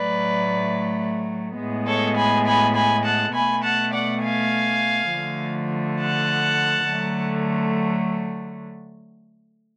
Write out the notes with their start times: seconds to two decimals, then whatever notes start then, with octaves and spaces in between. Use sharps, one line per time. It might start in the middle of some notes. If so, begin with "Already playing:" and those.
Already playing: A2 F#3 A3 B4 D5
1.58 A2 G#3 B3
1.87 A4 C#5
2.16 G#5 B5
2.46 G#5 B5
2.75 G#5 B5
3.04 F#5 A5
3.34 B2 A3 G#5 B5
3.63 F#5 A5
3.93 D5 F#5
4.22 F5 G#5
5.11 D3 F3 A3
6.00 F#5 A5
6.88 D3 F#3 A3